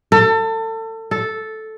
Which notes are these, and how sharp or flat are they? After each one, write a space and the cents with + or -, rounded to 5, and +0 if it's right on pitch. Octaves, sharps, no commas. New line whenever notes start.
A4 +30
A4 -5